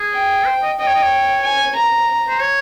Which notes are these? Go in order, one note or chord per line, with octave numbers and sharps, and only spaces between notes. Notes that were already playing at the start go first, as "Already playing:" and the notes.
Already playing: G#4
G5
C5
D#5
D#5 G5
C#5
D#5
C#5
G#5
A#5
C5
C#5